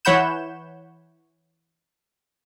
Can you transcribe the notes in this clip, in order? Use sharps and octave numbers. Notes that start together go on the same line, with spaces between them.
E3 C#5 F#5 B5 G6 E7